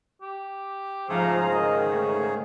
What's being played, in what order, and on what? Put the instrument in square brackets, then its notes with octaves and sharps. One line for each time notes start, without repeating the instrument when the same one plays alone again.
[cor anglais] G4
[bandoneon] G#2 C#3 G#4 [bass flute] F3 [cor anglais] A3 [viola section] C5 F5 A#5
[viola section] D#3 [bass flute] A#4 [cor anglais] D#5
[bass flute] A3 [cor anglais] C#4